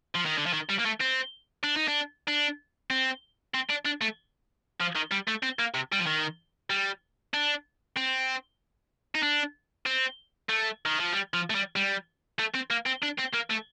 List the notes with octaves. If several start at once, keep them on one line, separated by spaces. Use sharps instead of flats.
F3
D#3
D3
F3
D#3
G3
A#3
A3
C4
D4
D#4
D4
D4
C4
C4
D4
D4
A3
F3
D#3
G3
A3
C4
A#3
C3
G3
F3
D#3
G3
D4
C4
D#4
D4
C4
A3
D#3
F3
G3
F3
A3
G3
G3
A3
C4
A#3
C4
D4
C4
A#3
A3